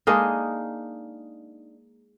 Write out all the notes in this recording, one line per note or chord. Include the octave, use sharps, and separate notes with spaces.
G#3 A#3 D4 D#4